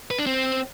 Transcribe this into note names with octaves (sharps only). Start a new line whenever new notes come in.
B4
D4
C4